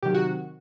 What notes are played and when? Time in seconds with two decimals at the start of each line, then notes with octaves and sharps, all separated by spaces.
0.03 C3 D#3 F#3 G4
0.14 F#4